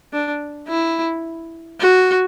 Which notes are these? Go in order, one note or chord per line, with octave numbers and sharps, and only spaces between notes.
D4
E4
F#4